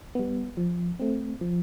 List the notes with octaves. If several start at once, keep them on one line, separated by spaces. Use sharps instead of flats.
G3 B3
F3
A3 C4
F3